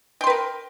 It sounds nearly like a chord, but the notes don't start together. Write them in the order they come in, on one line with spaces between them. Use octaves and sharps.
G5 C6 B4 A#4